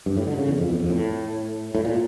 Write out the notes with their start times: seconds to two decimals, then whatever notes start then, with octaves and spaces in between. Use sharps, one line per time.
0.06 G2
0.17 A2
0.27 D3
0.38 C#3
0.48 E2
0.58 F2
0.69 E2
0.79 F2
0.90 A2
1.75 A2
1.85 A#2